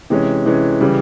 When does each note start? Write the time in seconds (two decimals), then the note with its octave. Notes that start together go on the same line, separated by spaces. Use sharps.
0.10 C3 E3 G#3 C#4
0.45 C3 E3 G#3 C#4
0.81 C#3 E3 G3